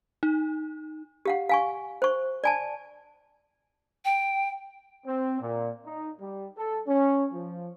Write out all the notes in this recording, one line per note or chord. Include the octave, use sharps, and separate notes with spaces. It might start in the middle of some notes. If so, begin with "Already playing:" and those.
D#4
G4 F5 F#5
F5 G#5 C#6
C5 C#6
D5 G#5 A5
G5
C4
A#2
D#4
G3
A4
C#4
F3